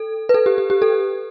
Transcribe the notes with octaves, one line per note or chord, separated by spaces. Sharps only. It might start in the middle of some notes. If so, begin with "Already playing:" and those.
Already playing: A4
B4
A4
G4
G4
G4
A4